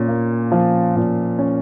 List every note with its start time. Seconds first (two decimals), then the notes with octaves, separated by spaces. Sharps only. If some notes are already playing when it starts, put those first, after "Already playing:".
Already playing: A#2 C#4
0.09 A#3
0.52 F3
0.96 A#2
1.39 C#4